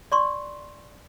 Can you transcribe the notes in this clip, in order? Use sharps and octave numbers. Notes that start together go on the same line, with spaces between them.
D5 C6 C#6